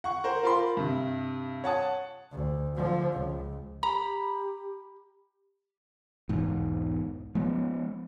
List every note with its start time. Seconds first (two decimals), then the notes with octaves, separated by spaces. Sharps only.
0.04 F#5 C#6
0.24 A#4 C5
0.43 F4 A#4 F5 B5 C6
0.77 G2 C3
1.64 C#5 F#5 A5 D#6
2.31 D2
2.74 D3 F3
3.12 C#2
3.83 G4 A#5 B5
6.29 B1 E2 G#2
7.35 F3 G#3 B3